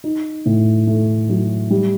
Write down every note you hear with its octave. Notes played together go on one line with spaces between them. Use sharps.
D#4
A2
A3
F#3
G3